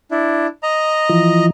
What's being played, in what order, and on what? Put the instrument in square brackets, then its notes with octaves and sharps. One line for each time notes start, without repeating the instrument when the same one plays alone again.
[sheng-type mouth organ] D4 E4
D#5 A#5
[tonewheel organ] E3 F3